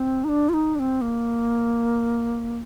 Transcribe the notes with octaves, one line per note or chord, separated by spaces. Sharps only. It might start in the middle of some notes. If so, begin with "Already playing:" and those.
Already playing: C4
D#4
D4
F4
D#4
D4
C4
A#3